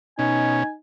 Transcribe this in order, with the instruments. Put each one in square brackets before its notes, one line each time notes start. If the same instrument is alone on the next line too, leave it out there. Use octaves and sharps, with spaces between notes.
[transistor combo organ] B2 C#4 [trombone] D#4 [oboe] G#5